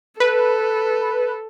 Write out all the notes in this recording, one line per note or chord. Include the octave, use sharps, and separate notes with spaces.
A4 B4